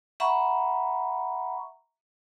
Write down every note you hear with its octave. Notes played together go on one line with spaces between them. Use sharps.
E5 F#5 A#5 B5 C#6